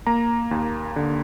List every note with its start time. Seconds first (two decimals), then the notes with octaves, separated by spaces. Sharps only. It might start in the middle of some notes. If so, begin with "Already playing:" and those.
0.06 A#3 A#5
0.51 D#2
0.96 D3